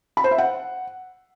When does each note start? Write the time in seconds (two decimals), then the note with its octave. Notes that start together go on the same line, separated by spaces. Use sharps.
0.17 B5
0.24 C5
0.31 E5
0.38 F#5